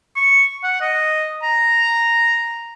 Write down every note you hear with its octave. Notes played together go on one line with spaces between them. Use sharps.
C#6
F#5
D#5
A#5